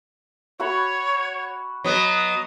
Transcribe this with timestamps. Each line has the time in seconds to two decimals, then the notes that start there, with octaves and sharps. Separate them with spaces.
0.60 F#4 C#5 F#5 B5
1.85 F#3 B3 D#5